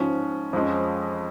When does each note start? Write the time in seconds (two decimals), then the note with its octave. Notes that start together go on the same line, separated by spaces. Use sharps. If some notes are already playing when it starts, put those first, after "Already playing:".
Already playing: G#2 F3 C#4
0.53 F2 F3 G#3 C#4